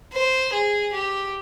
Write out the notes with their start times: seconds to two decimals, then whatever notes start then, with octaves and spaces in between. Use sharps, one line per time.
0.13 C5
0.53 G#4
0.93 G4